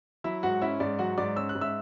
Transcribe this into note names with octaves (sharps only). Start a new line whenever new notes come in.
F#3 E4 E5
G#2 F#4 F#5
C#4 E4 E5
G#2 D5
F#3 F#4 F#5
G#2 D5 D6
C#4 E6
F#6
G#2
E5 E6